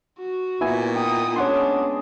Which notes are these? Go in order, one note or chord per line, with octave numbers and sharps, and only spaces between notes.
F#4
A#2 B3 E4 G#5
D#4 G5 D#6
G#3 C#4 D4 G#4 C#5 F#5 C6